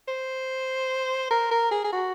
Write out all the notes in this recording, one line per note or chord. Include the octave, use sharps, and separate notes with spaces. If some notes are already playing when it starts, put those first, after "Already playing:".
C5
A#4
A#4
G#4
G#4
F#4